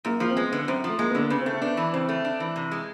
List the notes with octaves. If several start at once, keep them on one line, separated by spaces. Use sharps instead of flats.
F#2 A#3
F3 A#3
C4
G#3 B3
D3 B3
F#2 C4
F3 A3
G#3 A#3
B3
D3 A#3
C#3 B3
C4
A3
C4
B3 D4
E3
C#3 C4
A3
D4
E3
C3
G#3